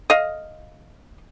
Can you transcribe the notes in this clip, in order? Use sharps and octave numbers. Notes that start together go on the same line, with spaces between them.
D#5 F5